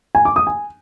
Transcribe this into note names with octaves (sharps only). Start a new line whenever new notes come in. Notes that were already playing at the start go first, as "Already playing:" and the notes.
G#5
D6
D#6
G#5